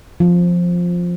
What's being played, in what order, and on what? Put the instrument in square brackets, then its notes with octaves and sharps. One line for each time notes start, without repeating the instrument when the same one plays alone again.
[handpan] F3